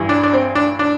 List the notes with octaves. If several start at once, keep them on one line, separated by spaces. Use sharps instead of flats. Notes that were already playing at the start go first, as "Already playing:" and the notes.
Already playing: G2 E3
D4
D4
C4
D4
D4